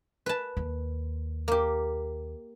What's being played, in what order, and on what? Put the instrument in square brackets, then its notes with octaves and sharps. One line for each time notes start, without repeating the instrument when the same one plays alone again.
[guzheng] B4 A5
[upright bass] D#2
[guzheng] A#3 G4